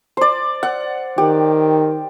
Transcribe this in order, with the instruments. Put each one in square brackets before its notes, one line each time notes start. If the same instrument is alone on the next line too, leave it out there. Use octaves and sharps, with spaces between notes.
[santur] C5 D5
F#5
[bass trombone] D#3 [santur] G4